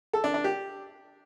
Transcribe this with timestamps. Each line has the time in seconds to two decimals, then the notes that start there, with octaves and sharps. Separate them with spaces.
0.13 A4
0.24 D4
0.34 D4
0.44 G4